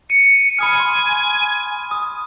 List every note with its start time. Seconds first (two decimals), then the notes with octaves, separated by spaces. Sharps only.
0.10 C#7 D#7
0.59 G#5 B5 D#6 F6
0.80 C6
1.91 D#6